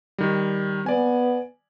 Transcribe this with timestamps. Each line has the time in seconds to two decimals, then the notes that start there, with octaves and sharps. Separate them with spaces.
0.18 D#3 G3
0.86 B3 D5 G#5